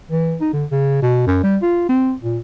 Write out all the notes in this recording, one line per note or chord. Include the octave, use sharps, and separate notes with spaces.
E3
D#4
D3
C#3
B2
F#2
G3
F4
C4
A#2